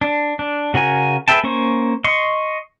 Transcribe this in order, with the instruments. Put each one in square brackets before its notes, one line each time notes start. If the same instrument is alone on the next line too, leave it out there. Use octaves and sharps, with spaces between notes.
[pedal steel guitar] D4
D4
C#3 F#4 A#4 G#5
G#4 B4 E5 G5 A5
A#3 C#4 C5 C#6
D#5 C6 C#6